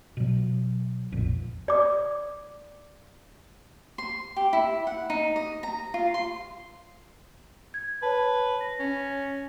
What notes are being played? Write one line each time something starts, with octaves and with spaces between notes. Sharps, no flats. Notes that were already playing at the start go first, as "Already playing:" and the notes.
B2 F#3
A#1 F2 A#2
D5 D6
C6
G4
E4
F#5
D#4
D#5
A#5
F4
C6
G#6
B4 C#5 A5
A#6
C#4